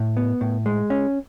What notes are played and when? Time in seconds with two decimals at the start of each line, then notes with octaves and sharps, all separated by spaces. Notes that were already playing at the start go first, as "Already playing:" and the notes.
Already playing: A2
0.17 B3
0.41 A2
0.66 G#3
0.90 C#4